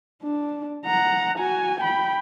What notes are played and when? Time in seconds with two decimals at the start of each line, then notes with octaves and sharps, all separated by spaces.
0.23 D4
0.86 F#5 A#5
1.39 F#4 G#5
1.81 G5 B5